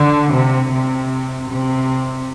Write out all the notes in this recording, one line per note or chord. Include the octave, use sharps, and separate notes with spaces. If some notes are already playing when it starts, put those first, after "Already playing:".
Already playing: D3
C3
C3
C3